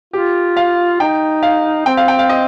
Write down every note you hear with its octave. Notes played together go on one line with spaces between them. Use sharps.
F4 G4
F5
D#4 G5
F5
C4 G5
F5
G5
F5
D#5